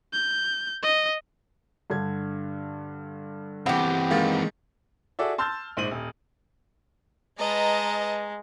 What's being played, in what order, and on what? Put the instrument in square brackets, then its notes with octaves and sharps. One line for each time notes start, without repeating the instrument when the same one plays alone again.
[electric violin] G6
D#5
[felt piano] G2 D3 G#6
[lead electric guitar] E3 C4 [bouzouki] B3 G4
[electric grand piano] D#3 G#3 A#3 [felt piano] F5 A6
[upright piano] F#4 G#4 A4 D5 E5
A5 C6 E6 F6 G6 A6
A#1 G#2 C5 D#7 F#7
D#1
[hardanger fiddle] G#3 [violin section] B4 A5 A#5 [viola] D#5